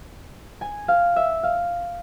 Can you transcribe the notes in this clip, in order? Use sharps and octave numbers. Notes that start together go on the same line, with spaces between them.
G#5
F5
E5
F5